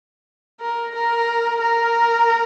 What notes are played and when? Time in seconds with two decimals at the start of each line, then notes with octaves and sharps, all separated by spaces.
0.60 A#4
0.95 A#4
1.61 A#4